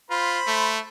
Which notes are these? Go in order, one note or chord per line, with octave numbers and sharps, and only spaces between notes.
F4 C5 B5
A3